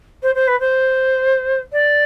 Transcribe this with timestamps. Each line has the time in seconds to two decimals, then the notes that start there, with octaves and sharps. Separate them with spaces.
0.23 C5
0.35 C5
0.47 B4
0.60 C5
1.72 D5